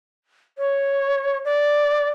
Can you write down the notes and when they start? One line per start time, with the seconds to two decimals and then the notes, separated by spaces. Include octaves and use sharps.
0.58 C#5
1.45 D5